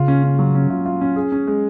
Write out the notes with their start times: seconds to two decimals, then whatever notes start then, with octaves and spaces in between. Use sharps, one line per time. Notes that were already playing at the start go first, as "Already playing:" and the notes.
Already playing: C#3 F4
0.08 C#4
0.23 C#4
0.39 F#3
0.55 C#4
0.70 F4
0.85 F4
1.01 C#4
1.16 G#4
1.32 C#4
1.47 G#3